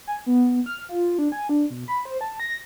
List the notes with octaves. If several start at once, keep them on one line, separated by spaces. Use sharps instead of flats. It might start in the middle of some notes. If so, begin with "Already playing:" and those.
G#5
B3
F6
F4
D4
G#5
D4
B2
B5
C5
A5
A#6